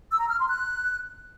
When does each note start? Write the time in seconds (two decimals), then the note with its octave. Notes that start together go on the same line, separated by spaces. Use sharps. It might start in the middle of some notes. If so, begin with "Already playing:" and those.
0.11 E6
0.21 A#5
0.30 F6
0.39 C6
0.48 F#6